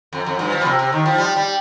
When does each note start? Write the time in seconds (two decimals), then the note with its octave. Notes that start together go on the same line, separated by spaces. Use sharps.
0.13 F2
0.26 F2
0.39 G2
0.52 F3
0.61 A#2
0.65 C3
0.79 C3
0.93 D#3
1.06 F3
1.18 G3
1.36 G3